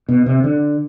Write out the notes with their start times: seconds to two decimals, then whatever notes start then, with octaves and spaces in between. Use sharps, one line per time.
0.08 B2
0.26 C3
0.44 D3